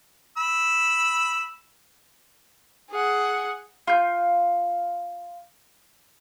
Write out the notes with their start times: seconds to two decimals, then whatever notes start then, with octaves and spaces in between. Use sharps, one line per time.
0.37 B5 E6
2.91 G#4 F#5
3.87 F4 G6